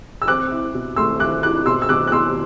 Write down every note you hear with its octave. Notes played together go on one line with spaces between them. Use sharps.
E6
C4 D6 F#6
E4
B2
A3 C6 E6
E4 D6 F#6
E4 D6 F#6
B2 C6 E6
E6
B2 D6 F#6
F#6
B2 C6 E6